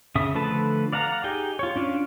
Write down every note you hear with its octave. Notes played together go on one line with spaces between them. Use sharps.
C#3 E5 D#6
D3 F3 A3 B4 A5
D5 F5 F#5 A#5
D#4 G4 G#4 G5
F4 C#5
C#4 D4 F4